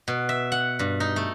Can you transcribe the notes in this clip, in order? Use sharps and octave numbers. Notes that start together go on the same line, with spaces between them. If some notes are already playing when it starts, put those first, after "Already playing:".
B2
E5
F#5
G2
D#4
A3